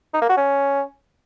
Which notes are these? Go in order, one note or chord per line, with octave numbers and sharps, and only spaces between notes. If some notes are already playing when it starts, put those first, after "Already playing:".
D#4
A#3
F#4
C#4